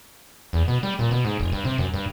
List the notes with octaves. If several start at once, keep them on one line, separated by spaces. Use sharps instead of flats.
E2
B2
G3
A#2
B2
G#2
F1
G2
C3
F#2
G2